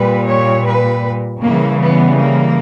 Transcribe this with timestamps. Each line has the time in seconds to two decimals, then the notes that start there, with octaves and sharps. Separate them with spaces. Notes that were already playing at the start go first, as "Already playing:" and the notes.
Already playing: A#2 G3 B4
0.26 C#5
0.66 B4
1.43 C#3 E3 G3 A#3
1.82 B3
2.20 A#3